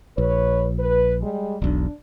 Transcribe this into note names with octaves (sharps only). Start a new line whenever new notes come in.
A#1 B4 C#5
B4
G3 G#3
E1 B1 D4